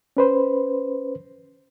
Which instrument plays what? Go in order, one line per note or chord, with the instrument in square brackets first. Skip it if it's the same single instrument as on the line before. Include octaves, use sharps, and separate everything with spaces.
[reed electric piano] C#4 B4 C5